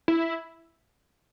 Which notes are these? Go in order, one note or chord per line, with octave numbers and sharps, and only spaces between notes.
E4